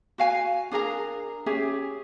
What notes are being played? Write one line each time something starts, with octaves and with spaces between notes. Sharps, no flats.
F#4 F5 G#5
D4 G#4 A#4 A#5
C#4 G4 G#4 E5